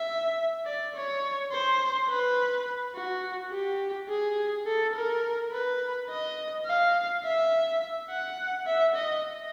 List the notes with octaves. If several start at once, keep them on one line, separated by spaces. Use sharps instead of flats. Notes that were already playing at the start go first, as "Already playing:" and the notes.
Already playing: E5
D5
C#5
C5
B4
F#4
G4
G#4
A4
A#4
B4
D#5
F5
E5
F#5
E5
D#5